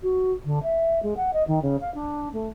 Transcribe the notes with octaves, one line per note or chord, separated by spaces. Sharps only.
F#4
D3
E5
G#3
F#5
D#5
D#3
C#3
F5
D4
A3